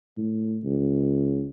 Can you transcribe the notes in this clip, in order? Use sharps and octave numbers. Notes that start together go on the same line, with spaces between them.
A2
C#2